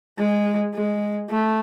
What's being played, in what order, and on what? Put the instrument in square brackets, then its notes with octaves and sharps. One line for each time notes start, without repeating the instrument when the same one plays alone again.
[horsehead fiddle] G#3
G#3
A3